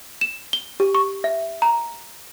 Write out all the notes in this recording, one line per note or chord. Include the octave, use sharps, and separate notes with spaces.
E7
G7
G4
C#6
E5
A#5